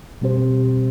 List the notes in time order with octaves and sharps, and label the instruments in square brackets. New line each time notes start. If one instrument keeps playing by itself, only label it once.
[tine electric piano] B2 G3 C4 G4 C5